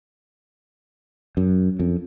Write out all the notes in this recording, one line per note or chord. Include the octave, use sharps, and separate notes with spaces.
F#2
F2